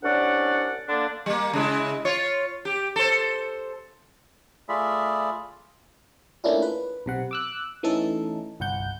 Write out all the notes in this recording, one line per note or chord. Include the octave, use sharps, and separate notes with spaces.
C2 C#4 D4 D5 F#5
D3 A#3 D4
G3 A#3
C#3 G#3 E4
F4 C#5
G4
A4 C5
A3 F4 G#4 D5 E5 B5
A3 A#3 C#4 D4 E4 F4
B4
B1 C3 F#5
D6 E6 F#6
E3 A3 C#4 D#4 A4
G1 C2 F#5 G6